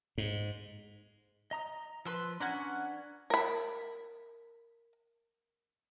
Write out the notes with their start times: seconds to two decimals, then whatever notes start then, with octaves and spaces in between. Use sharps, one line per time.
0.18 G#2
1.51 D#5 A#5 D#6
2.05 F3 B4 C6 E6
2.40 C#4 D4 B4 F#5 G#5 A#5
3.30 A#4 B5